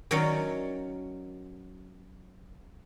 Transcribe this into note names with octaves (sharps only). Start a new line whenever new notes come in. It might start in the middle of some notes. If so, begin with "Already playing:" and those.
D#3 F#3 C#4 C#5 D5 F5